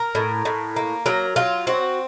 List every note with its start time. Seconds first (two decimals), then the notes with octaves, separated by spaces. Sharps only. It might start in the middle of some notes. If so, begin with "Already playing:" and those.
Already playing: A#4
0.15 A2
0.45 A2
0.76 A#3
1.06 F#3 A#4
1.36 F#3 F4
1.67 C4 F#4